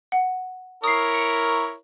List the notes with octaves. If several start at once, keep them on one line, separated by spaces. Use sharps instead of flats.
F#5
E4 A#4 C#5 D#6 C7
C#7